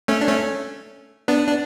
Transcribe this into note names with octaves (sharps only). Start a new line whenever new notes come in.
A3 C#4
D4
A3 C#4
B3 D4
D4